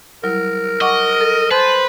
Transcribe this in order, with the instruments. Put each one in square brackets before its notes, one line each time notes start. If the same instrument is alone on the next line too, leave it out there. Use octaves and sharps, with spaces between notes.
[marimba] F#3 G3 E4 [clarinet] A#4
[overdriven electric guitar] D#5 [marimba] F#5 C#6 D6
[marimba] A4
[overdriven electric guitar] B4 [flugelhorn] C5 [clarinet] A5